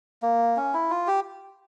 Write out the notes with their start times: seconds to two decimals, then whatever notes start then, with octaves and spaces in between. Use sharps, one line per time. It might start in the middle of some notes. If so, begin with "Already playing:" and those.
0.22 A#3
0.57 C#4
0.74 E4
0.90 F4
1.07 G4